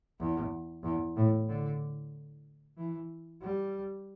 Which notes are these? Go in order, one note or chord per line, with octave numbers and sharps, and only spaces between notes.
E2
E2
A2
D3
E3
G3